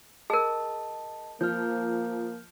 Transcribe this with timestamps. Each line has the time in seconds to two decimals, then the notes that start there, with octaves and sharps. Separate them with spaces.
0.30 G#4 A#4 D#5 A5
1.41 F3 A#3 F6 G6